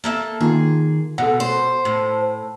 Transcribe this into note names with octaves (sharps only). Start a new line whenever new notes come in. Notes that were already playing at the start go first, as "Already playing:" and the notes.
A#3 A4 E5
D#3 A#3 F4 G#4
B2 A4 F#5
C5
A2